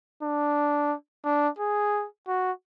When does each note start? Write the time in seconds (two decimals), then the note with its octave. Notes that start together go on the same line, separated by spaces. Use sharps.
0.23 D4
1.25 D4
1.58 G#4
2.28 F#4